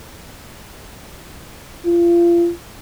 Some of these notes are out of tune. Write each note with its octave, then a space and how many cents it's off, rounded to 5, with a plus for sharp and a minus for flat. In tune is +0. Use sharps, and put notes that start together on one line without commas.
F4 -30